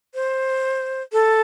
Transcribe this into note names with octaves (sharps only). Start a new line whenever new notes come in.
C5
A4